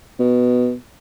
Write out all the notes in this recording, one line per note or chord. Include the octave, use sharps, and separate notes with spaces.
B2